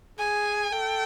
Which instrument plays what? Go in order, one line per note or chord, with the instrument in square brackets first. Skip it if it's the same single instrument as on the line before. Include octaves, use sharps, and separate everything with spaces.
[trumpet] G#4 [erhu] G#5
[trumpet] A4 [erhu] G5